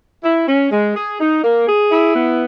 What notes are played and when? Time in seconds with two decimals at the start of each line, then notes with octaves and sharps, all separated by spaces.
0.24 E4
0.48 C#4
0.72 G#3
0.96 G#4
1.20 D#4
1.44 A#3
1.68 G#4
1.92 E4
2.16 B3